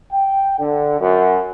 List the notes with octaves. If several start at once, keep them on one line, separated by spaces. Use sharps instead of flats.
G5
D3
F#2